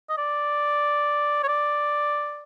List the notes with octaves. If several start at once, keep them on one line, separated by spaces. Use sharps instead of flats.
D#5
D5
C#5
D5